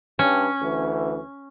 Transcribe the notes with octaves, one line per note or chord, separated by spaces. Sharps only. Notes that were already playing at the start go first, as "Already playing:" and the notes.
G2 C#4
D2 E3